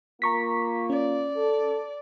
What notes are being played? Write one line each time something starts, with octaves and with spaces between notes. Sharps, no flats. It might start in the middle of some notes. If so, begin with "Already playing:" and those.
A#3 F4 A#5 C#6 B6
C#4 D5
A4